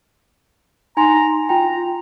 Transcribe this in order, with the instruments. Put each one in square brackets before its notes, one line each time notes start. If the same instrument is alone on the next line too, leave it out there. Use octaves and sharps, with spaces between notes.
[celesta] D#4 G#5 C6 [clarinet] A#5
[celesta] F4 G5 [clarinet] A#5